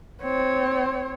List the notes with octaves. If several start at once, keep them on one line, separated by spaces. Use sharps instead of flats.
C4 C#5